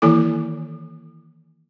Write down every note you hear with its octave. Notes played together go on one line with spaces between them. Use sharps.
D#3 E3 A#3 E4 A4 D6